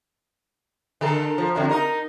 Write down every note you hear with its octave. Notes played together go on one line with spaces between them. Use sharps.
D3 A4 A#4
F3
F2 D3 F#3
D#4 A#4